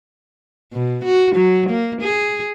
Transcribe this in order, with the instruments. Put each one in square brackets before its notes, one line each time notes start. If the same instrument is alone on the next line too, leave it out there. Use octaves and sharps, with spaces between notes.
[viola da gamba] B2
F#4
F#3
A#3
G#4